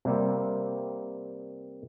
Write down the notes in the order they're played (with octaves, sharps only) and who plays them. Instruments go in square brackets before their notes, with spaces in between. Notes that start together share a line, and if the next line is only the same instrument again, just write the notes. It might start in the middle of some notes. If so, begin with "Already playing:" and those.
[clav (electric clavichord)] C3 G3 A#3 C4